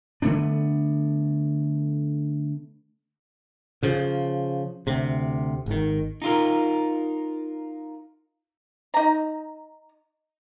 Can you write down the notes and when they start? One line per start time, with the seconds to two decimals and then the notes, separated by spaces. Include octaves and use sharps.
0.22 D3 A3 B3 D4
3.83 C#3 F3
4.87 D2 C3
5.66 G#1 D#3
6.22 D#4 F4 A#4
8.94 D#4 A#5